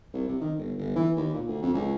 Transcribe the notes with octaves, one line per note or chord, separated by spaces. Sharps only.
C2
C3
D#3
G1
G1
E3
D#2
A#2
D2
F2
C#2